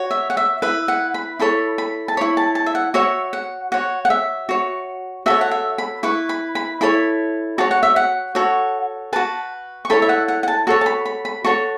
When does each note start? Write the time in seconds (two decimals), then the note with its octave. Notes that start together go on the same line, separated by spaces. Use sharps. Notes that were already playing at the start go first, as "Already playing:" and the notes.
Already playing: F#4 C#5
0.11 E5
0.30 F#5
0.37 E5
0.62 E4 B4 E5
0.88 F#5
1.14 B5
1.39 E4 A4 C#5 B5
1.78 B5
2.08 A5
2.17 E4 C#5 B5
2.37 A5
2.55 A5
2.66 E5
2.75 F#5
2.94 F#4 C#5 E5
3.33 F#5
3.72 F#4 C#5 F#5
4.05 F#5
4.10 E5
4.49 F#4 C#5
5.26 F#4 A4 C#5 E5
5.41 F#5
5.51 E5
5.78 B5
6.03 E4 B4 C#6
6.29 B5
6.55 B5
6.81 E4 A4 C#5 B5
7.58 F#4 C#5 A5
7.71 F#5
7.83 E5
7.96 F#5
8.35 F#4 A4 C#5
9.13 F#4 B4 A5
9.85 C#6
9.90 E4 A4 C#5 B5
10.02 E5
10.09 F#5
10.28 F#5
10.43 F#5
10.48 A5
10.67 F#4 A4 C#5 C#6
10.81 A5
10.86 B5
11.06 B5
11.25 B5
11.44 F#4 A4 C#5 C#6